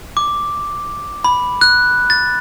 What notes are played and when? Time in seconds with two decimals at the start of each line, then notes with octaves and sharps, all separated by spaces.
0.17 D6
1.24 B5
1.61 F#6
2.10 A6